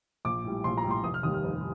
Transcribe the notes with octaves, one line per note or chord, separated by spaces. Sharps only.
A#1 D6
A2 G3
A#1 C6
A#5
A2 G3
C6
F1 D#6
F6
D#2 D#3 G3 D#6
F6
F1